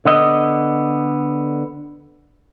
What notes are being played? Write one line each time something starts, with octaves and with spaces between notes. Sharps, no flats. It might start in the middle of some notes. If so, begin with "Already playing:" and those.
D3 B3 D#5